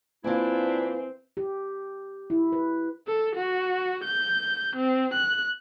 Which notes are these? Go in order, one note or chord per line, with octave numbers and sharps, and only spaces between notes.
E3 A#3 C4 D4 E4 F4
G4
E4
B4
A4
F#4
G6
C4
F#6